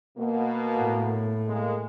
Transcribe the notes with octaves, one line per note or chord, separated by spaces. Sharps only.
B2 A#3
A2
G#3 A#3